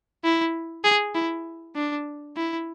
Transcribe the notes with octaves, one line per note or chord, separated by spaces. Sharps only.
E4
G#4
E4
D4
E4